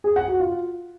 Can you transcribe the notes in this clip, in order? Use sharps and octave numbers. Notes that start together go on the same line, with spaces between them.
G#4
F#5
F#4
F4